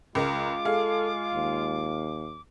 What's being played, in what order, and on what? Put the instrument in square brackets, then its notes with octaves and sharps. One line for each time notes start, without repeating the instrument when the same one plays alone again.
[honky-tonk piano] C#2 A#4 [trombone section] G#3 F4 [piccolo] D6
[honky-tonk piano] G#4 F5 [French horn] A4
[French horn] D#2